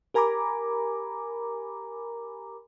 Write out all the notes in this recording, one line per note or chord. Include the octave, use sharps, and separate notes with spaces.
G4 A#4 G#5 A#5 B5 D6